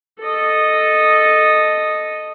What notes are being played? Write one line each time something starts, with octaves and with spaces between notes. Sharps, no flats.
A4 D#5